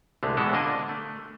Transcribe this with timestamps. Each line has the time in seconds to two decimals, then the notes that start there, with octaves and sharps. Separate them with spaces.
0.23 C2 D3 G#3 A3
0.37 B2 E3 G#3 B3 E4 A4
0.53 A#2 D3 A#3 D4 D#5
0.89 A3